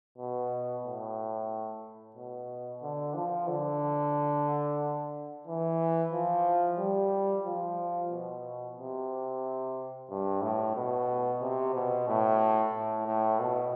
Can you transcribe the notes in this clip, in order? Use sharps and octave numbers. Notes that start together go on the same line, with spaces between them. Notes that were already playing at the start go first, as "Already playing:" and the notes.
B2
A2
B2
D3
F3
D3
E3
F3
G3
F3
B2
C3
G2
A2
B2
C3
B2
A2
A2
A2
B2